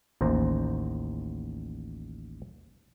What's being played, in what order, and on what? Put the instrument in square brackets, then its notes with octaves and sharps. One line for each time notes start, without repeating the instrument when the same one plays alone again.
[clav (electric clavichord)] A1 D#2 C5 A#5